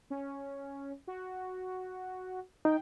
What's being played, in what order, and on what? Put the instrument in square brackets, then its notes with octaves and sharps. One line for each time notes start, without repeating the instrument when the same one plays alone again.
[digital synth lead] C#4
F#4
[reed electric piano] D#4 [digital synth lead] G5